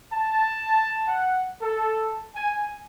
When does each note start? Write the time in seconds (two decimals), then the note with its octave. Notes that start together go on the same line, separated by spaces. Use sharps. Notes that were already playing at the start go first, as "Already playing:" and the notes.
0.13 A5
1.08 F#5
1.62 A4
2.36 G#5